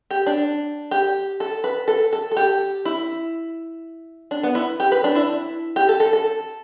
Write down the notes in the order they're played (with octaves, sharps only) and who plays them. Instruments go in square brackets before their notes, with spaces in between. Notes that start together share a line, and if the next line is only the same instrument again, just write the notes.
[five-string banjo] G4
D4
G4
A4
B4
A4
A4
A4
G4
E4
D4
B3
E4
G4
B4
D4
E4
G4
A4
A4
A4